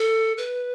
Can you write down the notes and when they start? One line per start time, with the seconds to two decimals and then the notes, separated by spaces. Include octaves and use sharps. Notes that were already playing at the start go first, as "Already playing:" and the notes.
Already playing: A4
0.38 B4